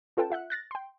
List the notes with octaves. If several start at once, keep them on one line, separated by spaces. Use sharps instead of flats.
C#4 F4 A4 B4 G5 A5
F4 E5 F#5 F#6
F#6 A6 A#6
G5 C6